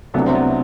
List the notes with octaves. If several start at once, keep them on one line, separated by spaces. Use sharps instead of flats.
C2 C3 F#3 A3 B3 D4
C4
B3